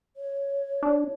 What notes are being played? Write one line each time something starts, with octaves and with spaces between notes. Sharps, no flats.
C#5
D4